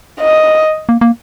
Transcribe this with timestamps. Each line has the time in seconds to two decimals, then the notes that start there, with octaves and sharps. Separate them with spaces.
0.20 D#5
0.89 A#3
1.01 A#3